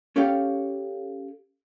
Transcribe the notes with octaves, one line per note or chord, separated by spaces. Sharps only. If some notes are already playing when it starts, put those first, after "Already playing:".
C#4 G4 A4 C#5 F5 G5